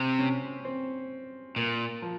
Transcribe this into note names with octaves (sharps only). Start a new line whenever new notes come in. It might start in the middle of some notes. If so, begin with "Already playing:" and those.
Already playing: C3 C4
C#4
C4
A#2 A#3
F3